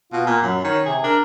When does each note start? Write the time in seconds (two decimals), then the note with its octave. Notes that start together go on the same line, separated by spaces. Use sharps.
0.12 B2 F4
0.27 A#2 A#3
0.42 F#2 F#3
0.64 D#3 C#5
0.86 C3 G#4
1.04 D4 A#4